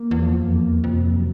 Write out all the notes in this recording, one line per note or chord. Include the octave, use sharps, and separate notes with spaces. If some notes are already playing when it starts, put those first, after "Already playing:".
Already playing: A#3
E2
F3
F2
E2 A#3
F2 C3
F#3